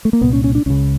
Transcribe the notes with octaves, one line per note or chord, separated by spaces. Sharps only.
A3
A#3
C2 A#2 B3
C#4
C#4
D4
C#2 C#3 C#4